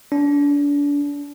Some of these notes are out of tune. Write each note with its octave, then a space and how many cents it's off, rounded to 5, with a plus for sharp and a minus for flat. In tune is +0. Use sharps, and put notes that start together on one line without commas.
D4 -35